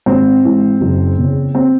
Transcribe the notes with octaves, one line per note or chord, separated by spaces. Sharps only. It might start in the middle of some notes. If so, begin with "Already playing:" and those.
G#1 C4
G#2 E3
F#1
E2 C#3
C4